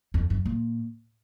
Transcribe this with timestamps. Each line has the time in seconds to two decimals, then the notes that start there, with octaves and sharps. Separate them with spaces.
0.14 F2
0.30 F#2
0.45 A#2